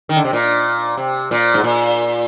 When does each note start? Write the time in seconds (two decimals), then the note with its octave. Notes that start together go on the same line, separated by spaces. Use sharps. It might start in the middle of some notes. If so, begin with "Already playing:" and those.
0.09 D#3
0.16 D3
0.24 C3
0.33 A#2
0.97 C3
1.31 A#2
1.54 G#2
1.64 A#2